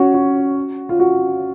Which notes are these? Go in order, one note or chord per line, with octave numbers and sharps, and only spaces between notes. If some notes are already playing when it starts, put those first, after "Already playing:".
Already playing: C#4 F#4
F#4
F4
F#4